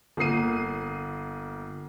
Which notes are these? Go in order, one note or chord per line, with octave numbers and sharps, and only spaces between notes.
G1 A#3 D#6 C7 D#7